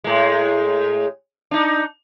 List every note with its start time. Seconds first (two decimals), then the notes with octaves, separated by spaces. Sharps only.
0.04 A2 G#3
1.51 D4 D#4